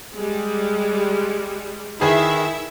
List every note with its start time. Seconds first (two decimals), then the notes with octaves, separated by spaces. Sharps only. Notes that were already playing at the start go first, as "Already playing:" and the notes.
0.15 G3 G#3
2.01 D#3 E4 G#4 B4 E5